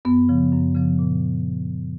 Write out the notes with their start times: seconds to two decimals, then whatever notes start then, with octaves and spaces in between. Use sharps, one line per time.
0.05 F#2 B3
0.29 C#3 F3
0.52 F#2
0.75 C#3 F3
0.99 A#2